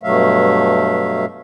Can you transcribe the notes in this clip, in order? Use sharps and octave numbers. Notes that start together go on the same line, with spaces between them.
G2 B2 F#3 A3 E5 F5